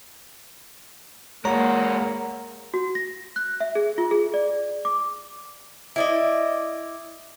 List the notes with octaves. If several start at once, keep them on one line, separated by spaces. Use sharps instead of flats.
G#3 A#3 F#4 C#5 A#5
F#4
A#6
F#6
E5
G#4
F4
G#4
D5
D6
E4 D5 D#5